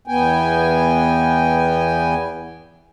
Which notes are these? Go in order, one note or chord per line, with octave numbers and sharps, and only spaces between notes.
E2 B3 G5 G#5